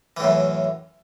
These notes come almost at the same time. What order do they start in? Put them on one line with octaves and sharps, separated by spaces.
E3 A2 F#2